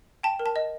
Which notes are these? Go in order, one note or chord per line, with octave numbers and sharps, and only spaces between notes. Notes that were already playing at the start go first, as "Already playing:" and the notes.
G5 A5
A#4
A5
D#5